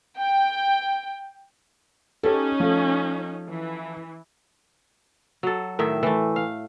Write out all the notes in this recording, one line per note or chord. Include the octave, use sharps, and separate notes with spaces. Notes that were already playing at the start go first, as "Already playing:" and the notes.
G5
C#4 D#4 G4 A4
F3 A3
E3
F#3 A4
A2 D#3 D#4 E5
E3 A3
F5